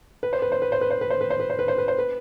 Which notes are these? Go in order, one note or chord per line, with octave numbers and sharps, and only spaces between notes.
B4
C5
B4
C5
B4
C5
B4
C5
B4
C5
B4
C5
B4
C5
B4
C5
B4
C5
B4